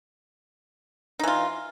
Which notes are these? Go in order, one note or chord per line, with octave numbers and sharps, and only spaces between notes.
E3 D#4 F4